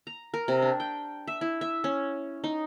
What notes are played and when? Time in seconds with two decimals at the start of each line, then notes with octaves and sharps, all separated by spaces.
0.07 A#5
0.34 A#4
0.48 C3
0.62 D4
0.80 G5
1.27 E5
1.41 E4
1.61 E5
1.84 C#4
2.44 D#4